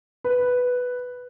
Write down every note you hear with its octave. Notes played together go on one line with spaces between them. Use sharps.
B4